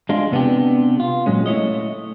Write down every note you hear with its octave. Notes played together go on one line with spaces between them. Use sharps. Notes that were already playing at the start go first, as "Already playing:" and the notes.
G#3 D4 F4
C3 B3 D4 G4
F4
A#2 F#3 G#3 C#4
A3 E4 C#5 D#5